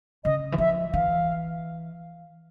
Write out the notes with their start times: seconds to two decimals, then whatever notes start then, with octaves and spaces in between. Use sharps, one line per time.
0.24 C#3 D#5
0.52 E3
0.58 F3 E5
0.93 E3 F5